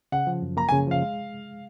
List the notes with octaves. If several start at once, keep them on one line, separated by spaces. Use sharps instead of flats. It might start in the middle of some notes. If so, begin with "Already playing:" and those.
C#3 F#5
F3
F#2
A#3 A#5
G#5
C#3
F3 F5
G#3